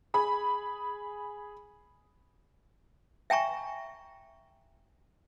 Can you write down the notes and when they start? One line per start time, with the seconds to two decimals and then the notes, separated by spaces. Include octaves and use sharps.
0.14 G#4 B5
3.30 E5 G5 G#5 A#5 C#6